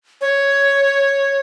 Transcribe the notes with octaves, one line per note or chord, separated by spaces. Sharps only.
C#5